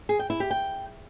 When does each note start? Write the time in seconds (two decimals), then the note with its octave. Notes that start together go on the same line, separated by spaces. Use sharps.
0.09 G#4
0.19 G5
0.30 E4
0.40 G4
0.50 G5